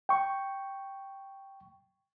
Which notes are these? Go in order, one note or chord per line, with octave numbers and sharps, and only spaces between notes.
G5 C#6